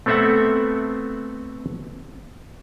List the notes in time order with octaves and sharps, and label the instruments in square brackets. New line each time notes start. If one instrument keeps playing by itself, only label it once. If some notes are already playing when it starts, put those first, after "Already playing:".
[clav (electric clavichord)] A3 B3 C4 A4 E5 F#5